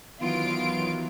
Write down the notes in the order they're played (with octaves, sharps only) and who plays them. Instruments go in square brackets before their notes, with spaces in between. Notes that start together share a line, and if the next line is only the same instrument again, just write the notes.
[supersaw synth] D#3 E3 F#3 [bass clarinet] B3 [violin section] F4 D7